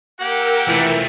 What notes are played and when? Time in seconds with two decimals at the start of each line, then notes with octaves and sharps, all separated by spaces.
0.19 A#3 G4 A#4 F#5 G5 E6
0.68 E3 F3 A3